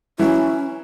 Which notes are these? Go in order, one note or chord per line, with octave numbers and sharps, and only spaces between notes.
E3 F#3 C#4 E4